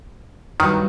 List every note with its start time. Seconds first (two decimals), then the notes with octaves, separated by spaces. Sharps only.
0.60 G2 D#3 F#3 G3